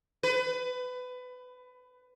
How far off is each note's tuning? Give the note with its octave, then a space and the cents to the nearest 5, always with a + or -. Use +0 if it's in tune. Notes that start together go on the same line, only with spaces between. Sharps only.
B4 +25